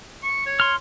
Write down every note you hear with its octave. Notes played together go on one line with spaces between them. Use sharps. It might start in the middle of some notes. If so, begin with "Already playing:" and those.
C#6
C#5
C6 F6